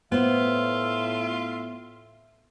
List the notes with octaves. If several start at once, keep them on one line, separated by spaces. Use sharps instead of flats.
A2 B3 F4 C5 E5